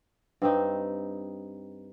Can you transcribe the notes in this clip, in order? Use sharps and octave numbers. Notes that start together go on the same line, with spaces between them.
G2 C4 D#4